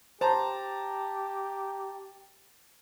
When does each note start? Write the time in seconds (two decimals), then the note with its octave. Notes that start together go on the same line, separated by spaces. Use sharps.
0.21 G4 C5 A5 A#5